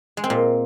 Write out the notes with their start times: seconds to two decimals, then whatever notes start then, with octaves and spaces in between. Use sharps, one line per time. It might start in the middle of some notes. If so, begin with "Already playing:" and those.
0.17 G#3
0.24 C4
0.30 A#2